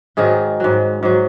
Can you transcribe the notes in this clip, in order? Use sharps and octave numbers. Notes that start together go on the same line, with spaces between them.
G#2 D#3 F#3 G#4
G#2 F#3
G#2 F#3